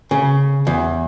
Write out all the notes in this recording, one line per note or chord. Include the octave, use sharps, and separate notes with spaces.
C#3
E2